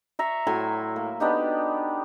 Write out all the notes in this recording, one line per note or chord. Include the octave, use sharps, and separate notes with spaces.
E5 A#5 C#6
A2 F#3 G#5 C6
A#3
B3 D4 D#4 G4